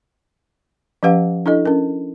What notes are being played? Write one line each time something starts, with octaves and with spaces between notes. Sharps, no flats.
F3 C#4 G4 B4 F5 F#5
D4 E4 A4 D#5
C#4 A#4